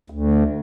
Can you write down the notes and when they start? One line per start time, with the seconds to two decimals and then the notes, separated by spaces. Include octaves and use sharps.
0.10 D2